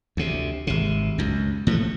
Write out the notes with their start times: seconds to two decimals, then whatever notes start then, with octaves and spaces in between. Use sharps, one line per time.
0.17 D2 C3
0.67 G#1 C3
1.18 C#2 F#2
1.67 A2 F3 F#3 A3